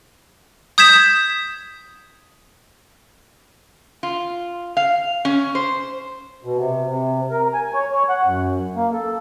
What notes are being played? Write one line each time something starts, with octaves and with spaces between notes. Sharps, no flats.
D#6 G6 G#6 B6 E7
F4
F5
C#4
C5
B2
C3
C3
A#4
G#5
C#5
C#5
F#5
F#2
A#3
A4